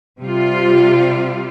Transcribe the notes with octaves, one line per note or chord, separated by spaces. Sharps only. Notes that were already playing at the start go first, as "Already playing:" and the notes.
C3 G3 F4